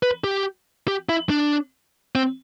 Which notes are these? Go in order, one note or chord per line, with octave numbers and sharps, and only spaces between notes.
B4
G4
G4
E4
D4
C4